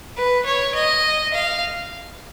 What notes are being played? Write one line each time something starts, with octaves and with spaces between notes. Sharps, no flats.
B4
C#5
D#5
F5